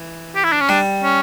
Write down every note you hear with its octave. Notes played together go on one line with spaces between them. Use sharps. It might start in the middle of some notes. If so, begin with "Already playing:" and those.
Already playing: E3
G4
E4
D4
C#4
G3 D4
C#4